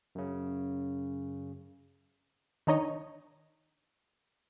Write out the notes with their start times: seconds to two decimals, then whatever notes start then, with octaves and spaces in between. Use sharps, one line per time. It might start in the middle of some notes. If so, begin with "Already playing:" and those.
0.15 F#2 C#3
2.67 D#3 D4 D#4 C#5 D#5